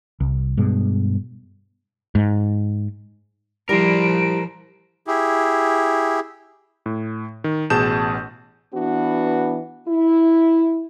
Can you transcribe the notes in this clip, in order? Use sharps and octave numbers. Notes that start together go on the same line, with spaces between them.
C2
G2 B2 G#3
G#2
F3 G3 E4 A#4 C5 D7
E4 G4 G#4
A2
D#3
A1 B2 G#4 A5 G6 E7
E3 B3 D4 F#4
E4